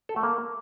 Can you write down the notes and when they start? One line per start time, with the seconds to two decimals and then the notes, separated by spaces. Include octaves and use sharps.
0.09 A4
0.16 A3
0.23 A#3